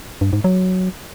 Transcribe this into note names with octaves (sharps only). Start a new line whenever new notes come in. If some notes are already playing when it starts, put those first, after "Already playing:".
G2
G#2
F#3